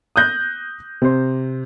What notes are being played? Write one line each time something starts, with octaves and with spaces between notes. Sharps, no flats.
D#6 F#6 G6 A#6
C3 C5